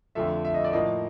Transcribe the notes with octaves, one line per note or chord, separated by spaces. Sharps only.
F2 D3 F3 A3 E5
E5
D#5
D5
A2 F3 A#3 D#5